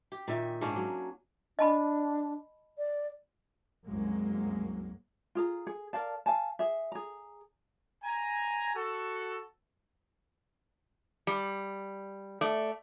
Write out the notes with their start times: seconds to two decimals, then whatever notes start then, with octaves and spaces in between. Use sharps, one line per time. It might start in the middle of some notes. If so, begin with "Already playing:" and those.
0.12 G4
0.28 A#2 D#3 E5
0.61 G#2 A#3 C#4 D4
0.76 F#3
1.59 D4 D#5 A5 B5
2.78 D5
3.87 C2 F#2 F#3 G#3 A#3
5.35 F4 G#4 A#5
5.67 G#4
5.93 A#4 D5 F5 A5
6.26 F5 G#5 A5
6.59 G#4 E5
6.92 G#4 A#5
8.03 G#5 A#5
8.75 F#4 A4
11.27 G3
12.41 A3 D5